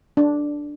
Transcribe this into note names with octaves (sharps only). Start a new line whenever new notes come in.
D4